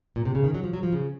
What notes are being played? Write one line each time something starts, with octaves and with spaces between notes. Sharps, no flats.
A#2
C3
C#3
D#3
F#3
F3
F#3
F3
C#3